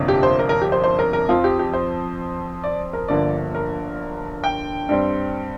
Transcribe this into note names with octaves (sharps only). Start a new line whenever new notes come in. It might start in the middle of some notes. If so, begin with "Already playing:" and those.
Already playing: G1 F2 C3 A#3 D4
G4
C5
A#4
A#4
G4
C5
C5
A#4
A#4
F2 F3 C4 F4
G4
G4
C5
D5
A#4
G1 G2 D3 F3 A#3 D5
A#4
G5
G2 G3 C4